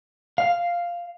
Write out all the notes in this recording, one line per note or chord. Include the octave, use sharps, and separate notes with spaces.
F5